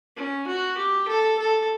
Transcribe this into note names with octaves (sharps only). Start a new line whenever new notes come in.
C#4
F#4
G4
A4
A4